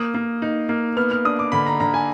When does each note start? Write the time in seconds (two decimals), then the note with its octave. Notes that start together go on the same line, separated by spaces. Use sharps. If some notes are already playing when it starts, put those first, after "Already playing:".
Already playing: A#3 D#6
0.14 A#3
0.42 D#4
0.69 A#3
0.97 B3 F6
1.11 F6
1.25 D4 D#6
1.39 D6
1.52 D3 B5
1.66 A#5
1.80 D3 A#5
1.94 G#5